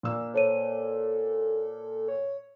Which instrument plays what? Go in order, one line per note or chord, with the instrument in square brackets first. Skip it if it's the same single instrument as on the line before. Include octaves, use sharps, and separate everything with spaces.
[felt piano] A#2 A#3 E6
[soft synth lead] A4 [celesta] C5 C#5 D#7
[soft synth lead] C#5